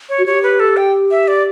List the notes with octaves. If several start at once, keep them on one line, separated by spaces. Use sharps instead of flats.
C#5
F#4
G4 C#5
B4
A4
G5
E5
D5